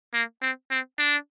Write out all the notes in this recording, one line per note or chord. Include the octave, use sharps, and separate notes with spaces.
A#3
C4
C4
D4